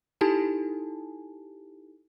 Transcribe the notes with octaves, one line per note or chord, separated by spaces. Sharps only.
D#4 E4 G4 A4 G#5 A5